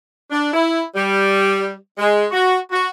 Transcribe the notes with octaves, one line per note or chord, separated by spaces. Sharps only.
D4
E4
G3
G#3
F#4
F#4